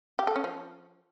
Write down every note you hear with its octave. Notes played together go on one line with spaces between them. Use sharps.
G4
A4
C#4
F3